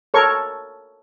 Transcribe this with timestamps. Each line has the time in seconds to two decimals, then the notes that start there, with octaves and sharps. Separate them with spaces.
0.14 A4 A#4 C#5 C#6